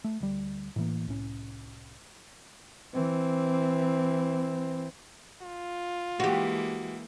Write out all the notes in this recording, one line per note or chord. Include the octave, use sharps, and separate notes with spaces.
A3
D2 G3
A2 E3 A#3
C2 A2 C#4
E3 C4
F4
E3 G#3 A#3 F#4 G4